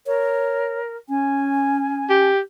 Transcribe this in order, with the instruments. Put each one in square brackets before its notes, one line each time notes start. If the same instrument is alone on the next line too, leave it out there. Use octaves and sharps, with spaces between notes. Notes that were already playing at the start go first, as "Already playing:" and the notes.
[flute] A#4 [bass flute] C#5
[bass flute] C#4 [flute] G#5
[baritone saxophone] G4